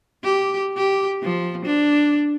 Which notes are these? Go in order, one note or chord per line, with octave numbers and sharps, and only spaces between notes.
G4
G4
F3
D4